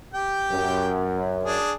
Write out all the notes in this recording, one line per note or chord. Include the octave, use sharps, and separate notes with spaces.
G4 G5
F#2
D4 G#4